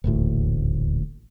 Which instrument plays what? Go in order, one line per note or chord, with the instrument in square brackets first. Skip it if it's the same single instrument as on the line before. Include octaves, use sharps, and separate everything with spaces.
[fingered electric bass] D#1 A1 D2 A2